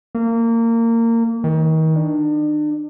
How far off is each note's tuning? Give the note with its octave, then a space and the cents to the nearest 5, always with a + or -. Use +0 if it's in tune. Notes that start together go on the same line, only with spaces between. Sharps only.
A#3 -25
D#3 +35
D4 +40